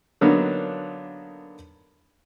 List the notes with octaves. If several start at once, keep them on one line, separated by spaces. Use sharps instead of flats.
D3 F#3 A#3 B3 D4 D#4